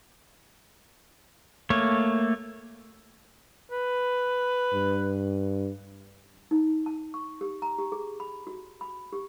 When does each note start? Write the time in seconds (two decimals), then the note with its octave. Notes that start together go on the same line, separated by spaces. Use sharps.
1.70 A3 A#3 C#5
3.71 B4
4.73 G2
6.51 D#4
6.86 A5
7.14 C#6
7.41 G4
7.62 A#5
7.78 G4
7.92 G#4
8.20 B5
8.47 F#4
8.81 B5
9.13 G4